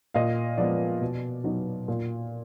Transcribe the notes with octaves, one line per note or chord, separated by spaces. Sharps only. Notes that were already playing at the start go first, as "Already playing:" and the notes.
A#2 D#5 F5
F3 G#3 B3 D5
B2
F#3 B3 D#4
A#2